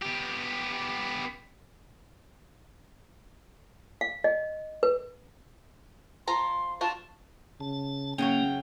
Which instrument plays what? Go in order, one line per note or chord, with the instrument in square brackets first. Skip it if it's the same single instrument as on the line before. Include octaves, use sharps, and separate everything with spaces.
[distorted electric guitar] B3 G4
[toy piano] F5
D#5
B4
[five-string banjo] F3 F4 A#5 [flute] C6
[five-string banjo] D4 F4 F#4 [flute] A5
[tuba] C#3 [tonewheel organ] A5
[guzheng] C#3 F#3 C#5 [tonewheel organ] A#3 [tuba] C#4 [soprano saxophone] G5